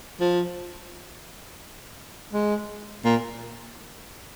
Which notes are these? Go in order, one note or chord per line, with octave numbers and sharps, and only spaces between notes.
F3
G#3
A#2